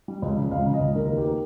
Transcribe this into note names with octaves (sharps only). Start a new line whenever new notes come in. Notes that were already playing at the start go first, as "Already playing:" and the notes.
G3
C#2
C#3
C#2 F5
C#3
D#5
C#2
D#2 A#4
A#3
G4
A#3